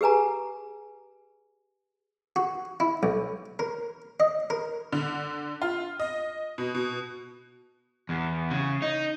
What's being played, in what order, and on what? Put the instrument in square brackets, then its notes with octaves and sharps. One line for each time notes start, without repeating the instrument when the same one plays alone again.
[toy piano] G4 G#4 B4 G#5 A#5
[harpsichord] F#4
E4
B1
A#4
D#5
A#4
[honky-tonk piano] D3
F4
D#5
B2
B2
[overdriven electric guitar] E2
C#3
D#4